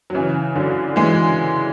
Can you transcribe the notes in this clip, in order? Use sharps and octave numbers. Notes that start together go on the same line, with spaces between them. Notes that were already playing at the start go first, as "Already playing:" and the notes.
F#3
C#3 E3
D3 F#3
E3 G#3